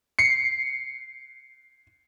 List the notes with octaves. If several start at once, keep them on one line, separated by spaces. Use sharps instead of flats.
C7 C#7